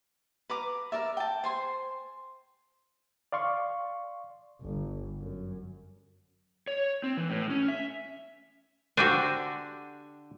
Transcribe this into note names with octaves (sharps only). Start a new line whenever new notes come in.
B4 A#5 D6
A#4 D5 E5
G5 A5
C5 G#5 C6
D5 F5 C6 C#6
G1
F#2
C#5
C4
E3
A2
C#4
E5
D3 D4 F#4 G4 C5 G#5